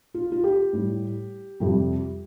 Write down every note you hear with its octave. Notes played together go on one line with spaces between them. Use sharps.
F4
F4
G4
A2 G3
F2 C3 G3